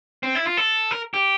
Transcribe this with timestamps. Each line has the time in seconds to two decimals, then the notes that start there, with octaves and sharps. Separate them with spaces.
0.23 C4
0.35 E4
0.46 F4
0.57 A4
0.91 A#4
1.14 G4